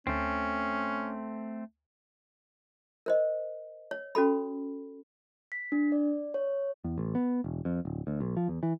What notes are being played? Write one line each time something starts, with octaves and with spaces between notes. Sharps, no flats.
D2 A3 C4 C#4
A#4 C5 D#5
C#5
C#4 F#4 A4 B5
B6
D4
D5
C#5
E2
A1
B3
E1
F2
D1
D2
B1
F3
E2
E3